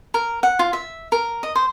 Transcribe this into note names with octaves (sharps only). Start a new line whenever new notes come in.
A#4
F#5
F4
E5
A#4
D#5
C5